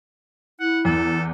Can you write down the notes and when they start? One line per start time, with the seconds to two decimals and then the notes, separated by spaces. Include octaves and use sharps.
0.60 E4 F#5
0.85 E2 A4